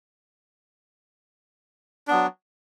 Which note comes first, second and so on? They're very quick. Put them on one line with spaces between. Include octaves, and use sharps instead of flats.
D4 B3 F#3